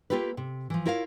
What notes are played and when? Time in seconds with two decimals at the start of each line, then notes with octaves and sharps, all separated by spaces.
0.10 A#3 C#4 F4 G4 A4 B4
0.37 C3
0.70 E3 F3
0.85 E4 F4 A#4 C#5 D#5 F5